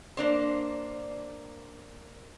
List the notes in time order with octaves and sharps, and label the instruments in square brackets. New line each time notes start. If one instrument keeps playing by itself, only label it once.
[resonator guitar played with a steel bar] A#3 D4 C5